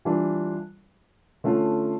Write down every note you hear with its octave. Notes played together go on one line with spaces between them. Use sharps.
E3 G3 D4 F4
D3 A3 C#4 F4